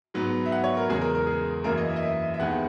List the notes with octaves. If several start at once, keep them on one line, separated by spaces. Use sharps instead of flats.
G#2 F#3 B3
E5
F#5
C#5
A#4
E2 C#3 G#3 G#4
A#4
A#4
G#4
F#2 E3 A#3 A#4
D#5
E5
D#5
E5
E5
D#2 D#3 G#3 B3 F#5